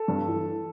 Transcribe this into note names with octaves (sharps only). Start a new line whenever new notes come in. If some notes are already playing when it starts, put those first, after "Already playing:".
Already playing: A4
G2
E3